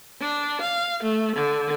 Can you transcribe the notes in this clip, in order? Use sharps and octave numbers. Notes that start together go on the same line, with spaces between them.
D4
F5
A3
D3